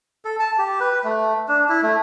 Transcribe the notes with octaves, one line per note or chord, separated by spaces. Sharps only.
A4
A5
G4
B4
A3
D4
E4
A3